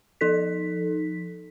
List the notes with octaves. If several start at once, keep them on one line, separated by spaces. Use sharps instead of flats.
F3 D#4 A4 B6